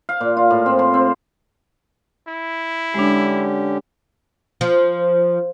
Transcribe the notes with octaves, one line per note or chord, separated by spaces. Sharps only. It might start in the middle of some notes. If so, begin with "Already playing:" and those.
F5
A#2
F4
A2
C4
C6
C4
E4
D3 G#3 C#4 D4 G4
F3